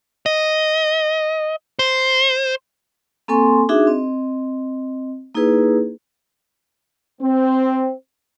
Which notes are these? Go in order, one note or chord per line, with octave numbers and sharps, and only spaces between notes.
D#5
C5
A#3 C4 A4 G#5 C6 C#6
D4 D#4 F#4 G#4 E5
C4 D#5
A#3 D#4 E4 G#4 B4
C4